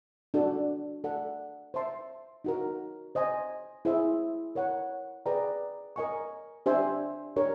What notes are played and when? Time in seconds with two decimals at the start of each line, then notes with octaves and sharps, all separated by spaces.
0.34 D4 F#4 A4
1.04 A4 D5 F#5
1.74 C5 E5 A5 C6
2.44 D#4 F#4 A#4
3.15 C5 D#5 G#5
3.85 E4 G#4 C5 E5
4.55 A#4 C#5 F#5
5.26 G#4 B4 D5 G5 A#5
5.96 A#4 D#5 G#5 C#6
6.66 D4 G4 C5 E5 G#5
7.36 D4 G4 A#4 C#5